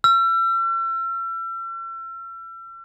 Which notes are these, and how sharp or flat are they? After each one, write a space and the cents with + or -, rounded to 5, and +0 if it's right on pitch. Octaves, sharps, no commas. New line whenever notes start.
E6 +40